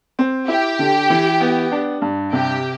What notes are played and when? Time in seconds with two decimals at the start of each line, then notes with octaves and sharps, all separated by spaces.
0.19 C4
0.48 E4 G4
0.79 D3
1.10 E3
1.41 B3
1.72 D4
2.02 G2
2.33 C3 G4